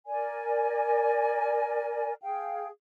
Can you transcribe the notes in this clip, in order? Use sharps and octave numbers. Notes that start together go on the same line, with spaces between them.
A#4 D5 G#5
G#4 F5 G5